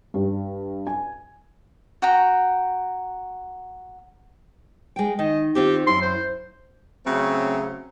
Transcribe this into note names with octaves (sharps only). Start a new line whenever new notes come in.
G2
G#5
F#4 F#5 G5 A#5
G#3 G5
D#3 D#5
D#3 C4 F4 G4
F#2 E4 C6
C5
C#3 F#3 A3 C4